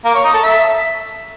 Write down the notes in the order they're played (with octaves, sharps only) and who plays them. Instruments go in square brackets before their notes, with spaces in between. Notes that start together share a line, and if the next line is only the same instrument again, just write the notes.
[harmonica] A#3
C#5
D#4
A4
E5